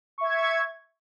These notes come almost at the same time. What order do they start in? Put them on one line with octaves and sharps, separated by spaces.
C#6 E5 G#6